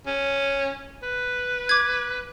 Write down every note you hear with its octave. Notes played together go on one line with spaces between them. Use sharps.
C#4
B4
D6 G#6